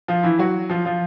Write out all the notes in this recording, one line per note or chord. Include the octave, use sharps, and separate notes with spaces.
F3 F4
E3 E4
F#3 F#4
F3 F4
F3 F4